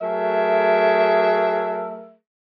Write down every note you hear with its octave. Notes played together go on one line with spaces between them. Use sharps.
F#3 A3 G#4 A#4 E5